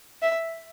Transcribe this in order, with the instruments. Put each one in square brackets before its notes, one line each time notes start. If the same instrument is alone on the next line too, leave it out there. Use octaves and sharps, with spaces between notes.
[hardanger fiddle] E5